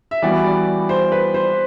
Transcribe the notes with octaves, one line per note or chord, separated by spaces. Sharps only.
E5
E3 G3 B3 F#4 D5
D5
C5
B4
C5